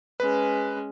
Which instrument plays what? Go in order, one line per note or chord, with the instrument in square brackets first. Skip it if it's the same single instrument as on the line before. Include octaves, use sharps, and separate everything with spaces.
[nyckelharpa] G#3 C#4 [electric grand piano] B4